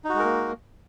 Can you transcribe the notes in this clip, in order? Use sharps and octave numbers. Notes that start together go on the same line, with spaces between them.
G#3 A#3 D#4 F#4 A#4